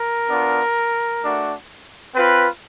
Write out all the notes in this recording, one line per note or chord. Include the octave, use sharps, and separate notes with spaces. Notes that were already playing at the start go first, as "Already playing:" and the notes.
Already playing: A#4
B3 D4 F4
A3 D4 F#4
C4 F4 B4